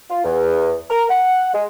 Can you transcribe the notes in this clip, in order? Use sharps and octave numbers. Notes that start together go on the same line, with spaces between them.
F4
E2
A#4
F#5
G#3